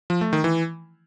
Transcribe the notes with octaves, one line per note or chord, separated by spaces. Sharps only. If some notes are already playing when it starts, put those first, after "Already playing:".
F3
A3
D#3
E3